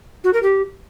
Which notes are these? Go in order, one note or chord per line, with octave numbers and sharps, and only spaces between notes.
F#4
A#4
G4